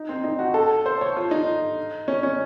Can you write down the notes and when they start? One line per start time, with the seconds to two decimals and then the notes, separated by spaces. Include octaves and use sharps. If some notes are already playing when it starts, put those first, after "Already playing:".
Already playing: D#4
0.09 C4
0.24 D#4
0.39 F#4
0.54 A4
0.86 C5
1.01 C#5
1.17 F4
1.31 D#4
2.08 C#4
2.23 C#4